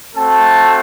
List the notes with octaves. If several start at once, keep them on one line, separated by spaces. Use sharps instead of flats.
A3 C4 F#4 A4 A5